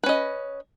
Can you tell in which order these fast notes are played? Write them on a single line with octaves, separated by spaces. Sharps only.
B4 C#4 D#5